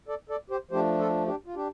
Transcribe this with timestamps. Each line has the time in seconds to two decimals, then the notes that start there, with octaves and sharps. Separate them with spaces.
0.08 A4 D5
0.29 A4 D5
0.50 G4 C5
0.71 F3 A3 D4 G4 C5
0.99 F4 A4
1.27 D4 G4
1.46 F4
1.55 D4 G4